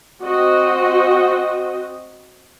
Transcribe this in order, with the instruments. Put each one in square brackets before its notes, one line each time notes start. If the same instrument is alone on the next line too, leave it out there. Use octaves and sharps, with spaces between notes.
[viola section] C4 F#4 D#5